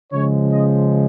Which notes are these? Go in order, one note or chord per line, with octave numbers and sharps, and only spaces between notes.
C#3 F3 G#3 C#5
D#5